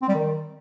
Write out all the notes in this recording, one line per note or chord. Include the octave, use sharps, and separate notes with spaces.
C4
G3
D#3